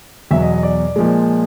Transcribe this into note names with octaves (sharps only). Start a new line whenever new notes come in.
E2 B2 F#3 E5
D#5
D#5
D5
A#2 F3 G#3